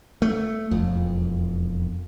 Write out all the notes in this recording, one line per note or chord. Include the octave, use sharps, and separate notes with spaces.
A3
E1 F2